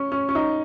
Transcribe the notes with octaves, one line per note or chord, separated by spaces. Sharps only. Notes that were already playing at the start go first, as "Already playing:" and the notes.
Already playing: C#4
C#4
C#4
D#4